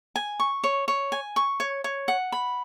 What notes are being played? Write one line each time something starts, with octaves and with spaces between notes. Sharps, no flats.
G#5
C#6
C#5
C#5
G#5
C#6
C#5
C#5
F#5
B5